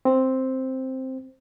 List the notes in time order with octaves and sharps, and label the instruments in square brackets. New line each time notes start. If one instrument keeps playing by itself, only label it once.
[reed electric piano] C4 C5